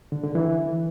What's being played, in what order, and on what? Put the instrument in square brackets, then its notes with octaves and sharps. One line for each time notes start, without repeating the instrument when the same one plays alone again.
[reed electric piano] D3
D3
E3